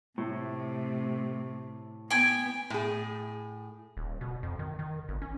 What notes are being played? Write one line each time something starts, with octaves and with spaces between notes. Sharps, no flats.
A2 C3 A3
B3 G5 G#5
A2 G#4
D#1
B2
F2
D#3
D#3
G1
C#4